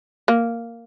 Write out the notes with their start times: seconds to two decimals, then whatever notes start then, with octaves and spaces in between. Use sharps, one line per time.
0.28 A#3